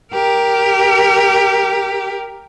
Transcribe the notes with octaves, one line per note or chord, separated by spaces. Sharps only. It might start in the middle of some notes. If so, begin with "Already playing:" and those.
G4 A#4